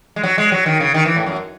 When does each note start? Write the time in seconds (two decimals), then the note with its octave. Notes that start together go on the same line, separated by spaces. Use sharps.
0.16 G#3
0.23 F#3
0.38 G#3
0.52 F#3
0.66 D#3
0.80 C#3
0.94 D#3
1.05 E3
1.16 A2
1.26 F#2